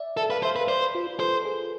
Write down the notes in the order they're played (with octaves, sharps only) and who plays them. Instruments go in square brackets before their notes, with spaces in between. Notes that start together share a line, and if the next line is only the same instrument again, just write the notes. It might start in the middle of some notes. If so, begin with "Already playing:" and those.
Already playing: [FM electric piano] D5 E5
[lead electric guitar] A4 [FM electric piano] E5
[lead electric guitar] B4 [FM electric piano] F5
[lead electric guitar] C5 [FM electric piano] E5
[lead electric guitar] B4
[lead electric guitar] C5 [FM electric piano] D5
[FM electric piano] B4
F4
F4
[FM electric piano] A4 [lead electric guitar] C5
[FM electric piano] G#4